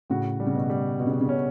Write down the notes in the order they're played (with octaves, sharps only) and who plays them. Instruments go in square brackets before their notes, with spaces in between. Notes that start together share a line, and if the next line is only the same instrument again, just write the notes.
[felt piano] A2 C#3 [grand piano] F#4
[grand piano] G3
[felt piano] C#3
B2
[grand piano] G3
[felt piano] B2 [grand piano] F#4
[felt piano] C#3
B2
C#3
[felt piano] B2 [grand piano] C#4